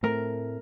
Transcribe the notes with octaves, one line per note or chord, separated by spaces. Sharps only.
A2 A3 C4 A#4